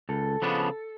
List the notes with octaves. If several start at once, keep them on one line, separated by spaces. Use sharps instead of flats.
C#2 A4
C#3 F3 B3 D4